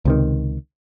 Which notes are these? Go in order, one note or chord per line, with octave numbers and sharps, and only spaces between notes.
C#2 C3 D#3